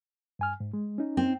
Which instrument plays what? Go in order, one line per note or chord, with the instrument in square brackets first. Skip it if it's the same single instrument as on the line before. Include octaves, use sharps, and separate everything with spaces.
[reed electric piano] G2 G#5 F6
G#2
G#3
C#4 D#4
[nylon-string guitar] C4